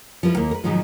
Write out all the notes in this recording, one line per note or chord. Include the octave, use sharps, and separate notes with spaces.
F3 G3 E4 B4
D#2 A#3
A#4 B4
G#2 B2 D#3 F3 F#3 G#3